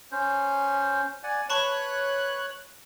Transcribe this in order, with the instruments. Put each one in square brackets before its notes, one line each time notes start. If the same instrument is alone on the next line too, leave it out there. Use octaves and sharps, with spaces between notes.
[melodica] C#4 C5
D5 F#5 G#5
[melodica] B4 [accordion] C#5 F#6 [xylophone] A5 B5 C#6